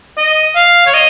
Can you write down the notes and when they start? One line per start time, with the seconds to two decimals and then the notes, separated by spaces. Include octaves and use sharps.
0.18 D#5
0.56 F5
0.87 C#5
0.94 D#5